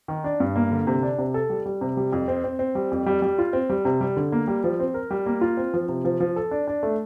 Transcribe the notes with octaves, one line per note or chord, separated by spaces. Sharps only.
D#3
D4
G2
A#3
D3
C3
D4
C3
A4
G3
G3
C3
G3
F2
C4
C4
C4
G3
F2
G3
G3
F4
C4
G3
C3
G3
D3
A#3
G3
F3
C4
A#4
G3
A#3
F4
C4
F3
C3
F3
F3
A4
D4
D4
A3